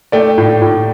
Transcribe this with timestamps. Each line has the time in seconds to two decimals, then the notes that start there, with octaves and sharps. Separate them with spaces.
0.12 A3 D5 G5
0.38 A2
0.62 A2